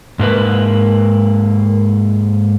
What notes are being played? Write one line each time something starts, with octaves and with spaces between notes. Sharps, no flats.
G#2 A#3 B4